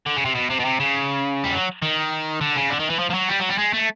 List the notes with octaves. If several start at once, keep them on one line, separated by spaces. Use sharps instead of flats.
D3
C#3
C3
B2
C3
B2
C3
C#3
G3
F#3
D#3
D3
C#3
D3
D#3
E3
F3
F3
F#3
G3
F#3
G3
G#3
A3